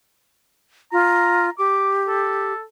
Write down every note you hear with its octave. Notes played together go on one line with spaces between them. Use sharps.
F4 A#5
G4 D6
A4